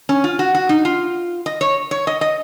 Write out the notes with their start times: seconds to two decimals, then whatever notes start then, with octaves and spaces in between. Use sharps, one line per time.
0.09 C#4
0.24 F4
0.39 F#4
0.55 F#4
0.69 D#4
0.85 F4
1.46 D#5
1.61 C#5
1.91 C#5
2.07 D#5
2.21 D#5